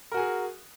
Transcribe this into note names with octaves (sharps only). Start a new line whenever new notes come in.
F#4 G#4 A#4 G#5